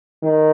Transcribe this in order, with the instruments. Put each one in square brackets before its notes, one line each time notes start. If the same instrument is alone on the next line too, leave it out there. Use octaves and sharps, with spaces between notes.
[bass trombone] D#3